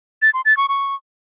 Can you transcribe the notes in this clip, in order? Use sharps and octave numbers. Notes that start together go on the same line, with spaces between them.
A6
C6
A6
C#6
C#6